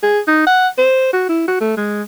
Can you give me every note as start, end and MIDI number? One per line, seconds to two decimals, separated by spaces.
0.03 0.20 68
0.28 0.44 63
0.47 0.68 78
0.78 1.11 72
1.13 1.25 66
1.29 1.46 64
1.48 1.58 66
1.61 1.77 57
1.77 2.02 56